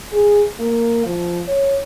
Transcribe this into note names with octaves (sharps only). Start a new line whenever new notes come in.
G#4
A#3
F3
C#5